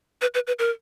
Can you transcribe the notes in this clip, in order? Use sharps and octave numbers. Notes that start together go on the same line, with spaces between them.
B4
B4
B4
A#4